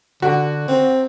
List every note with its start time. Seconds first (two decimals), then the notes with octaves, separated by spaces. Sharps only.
0.22 D3 F#4
0.68 C4